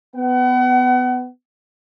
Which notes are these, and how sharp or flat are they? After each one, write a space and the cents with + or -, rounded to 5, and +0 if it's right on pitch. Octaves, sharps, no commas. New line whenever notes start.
B3 +20 F#5 +35